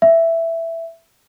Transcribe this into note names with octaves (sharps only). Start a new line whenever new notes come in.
E5